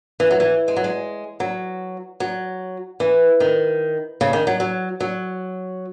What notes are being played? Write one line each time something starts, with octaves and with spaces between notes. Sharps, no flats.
E3
F#3
E3
G#3
F#3
G#3
F#3
F#3
E3
D#3
C#3
D#3
F#3
F#3
F#3